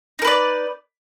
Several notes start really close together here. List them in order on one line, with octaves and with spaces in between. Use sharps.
D#4 A#4 B4 D5